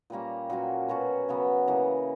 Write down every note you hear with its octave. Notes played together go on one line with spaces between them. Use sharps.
A#2 G3 A#3 C#4
A#2 F#3 C#4 F#4
B2 F#3 C#4 F#4
C#3 F#3 B3
C#3 E3 A#3